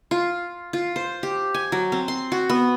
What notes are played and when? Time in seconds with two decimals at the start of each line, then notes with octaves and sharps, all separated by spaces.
0.11 F4
0.73 F4
0.96 C5
1.23 G4
1.54 G#5
1.72 F#3
1.92 C4
2.08 C6
2.32 F#4
2.49 B3